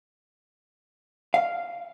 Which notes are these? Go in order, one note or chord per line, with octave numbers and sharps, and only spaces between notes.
F5